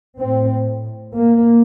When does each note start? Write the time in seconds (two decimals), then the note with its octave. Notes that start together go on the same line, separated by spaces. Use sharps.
0.20 A2 C4
1.15 A#3